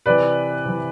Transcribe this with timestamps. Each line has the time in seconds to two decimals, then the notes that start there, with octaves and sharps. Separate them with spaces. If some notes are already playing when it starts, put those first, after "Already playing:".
0.06 C3 E3 B4 D5
0.65 C3 E3